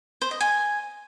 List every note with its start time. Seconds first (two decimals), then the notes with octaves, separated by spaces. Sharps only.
0.22 C5
0.31 D#5
0.41 G#5